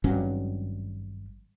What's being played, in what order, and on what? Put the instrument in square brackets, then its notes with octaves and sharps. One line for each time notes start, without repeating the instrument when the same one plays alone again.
[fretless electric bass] G#1 G2 F#3 C#4